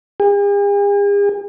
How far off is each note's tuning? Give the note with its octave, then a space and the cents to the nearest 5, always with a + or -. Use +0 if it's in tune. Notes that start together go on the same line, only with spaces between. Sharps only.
G#4 -45